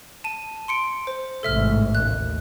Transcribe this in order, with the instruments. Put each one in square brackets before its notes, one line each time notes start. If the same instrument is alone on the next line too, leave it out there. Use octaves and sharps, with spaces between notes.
[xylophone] A5 D#7
C6 C#7 D7
C5
[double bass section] A1 G#2 C3 [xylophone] A4 E5 F6
[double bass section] D#2 [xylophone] F#6